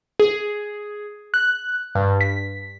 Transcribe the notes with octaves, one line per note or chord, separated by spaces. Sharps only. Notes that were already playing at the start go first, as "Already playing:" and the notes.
G#4
F#6
G2
B6